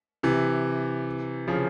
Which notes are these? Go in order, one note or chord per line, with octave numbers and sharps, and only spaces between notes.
C3 E3
C#3 F3